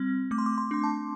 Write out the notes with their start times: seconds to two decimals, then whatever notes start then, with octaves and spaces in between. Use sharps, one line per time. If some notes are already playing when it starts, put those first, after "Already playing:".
Already playing: G3 C4
0.31 A3 D6
0.38 C6
0.46 D6
0.58 C6
0.71 D4 C6
0.84 A5